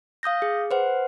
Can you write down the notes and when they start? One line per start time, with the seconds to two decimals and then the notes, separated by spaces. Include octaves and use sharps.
0.23 F5 D#6 G6 A#6
0.42 G#4
0.71 B4 C5 F#5